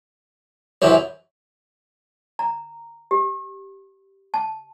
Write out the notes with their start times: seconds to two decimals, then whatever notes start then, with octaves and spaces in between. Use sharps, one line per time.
0.82 C2 F#2 E3 C#5
2.39 A#5
3.11 G4
4.34 A5